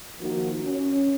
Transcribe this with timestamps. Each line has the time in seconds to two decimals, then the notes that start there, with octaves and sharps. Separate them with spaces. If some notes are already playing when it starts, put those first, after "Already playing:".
0.20 D#3 F3 A#3 D#4 F#4
0.63 C#4